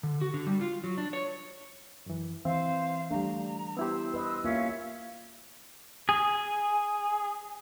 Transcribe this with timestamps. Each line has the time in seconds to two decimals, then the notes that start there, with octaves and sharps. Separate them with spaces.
0.03 D3
0.21 F#4
0.34 D3
0.47 G3
0.61 F4
0.84 F#3
0.98 D4
1.13 C#5
2.06 F#2 E3
2.45 E3 C4 C5 E5 F5
3.11 G3 A3 D4 G4 A#5
3.77 B3 E4 G4 C5 E6
4.14 B4 D#5
4.44 A#3 C#4 F4 E5 F5
6.09 G#4